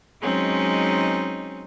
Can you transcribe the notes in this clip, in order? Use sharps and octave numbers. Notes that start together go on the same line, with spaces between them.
F#3 G#3 C4 C#4 D#4